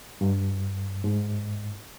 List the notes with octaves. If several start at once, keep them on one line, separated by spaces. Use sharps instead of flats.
G2
G#2